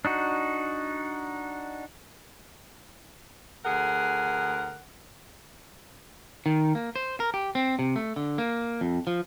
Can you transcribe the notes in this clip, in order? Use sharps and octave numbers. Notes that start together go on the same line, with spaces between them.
D4 D#4 F#4
D2 G#4 A#4 F#5
D#3
A#3
C5
A#4
G4
C4
C3
A3
D3
A#3
F2
F3